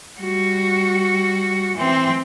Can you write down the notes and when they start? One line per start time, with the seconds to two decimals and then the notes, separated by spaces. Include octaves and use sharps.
0.19 G3 F#4
1.75 E3 C4